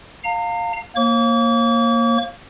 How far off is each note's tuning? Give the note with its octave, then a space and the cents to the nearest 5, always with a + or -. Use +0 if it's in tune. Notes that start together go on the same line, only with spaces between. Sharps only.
F5 +15 A#5 -35
A#3 +0 C#5 -45 D6 -45